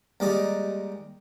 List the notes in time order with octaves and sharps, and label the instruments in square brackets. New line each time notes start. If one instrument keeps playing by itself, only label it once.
[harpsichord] D#2 G3 G#3 D#4 D5 D6